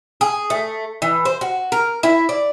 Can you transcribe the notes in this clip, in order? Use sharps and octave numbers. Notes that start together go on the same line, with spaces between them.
G#4
A3
E3
C5
F#4
A#4
E4
D5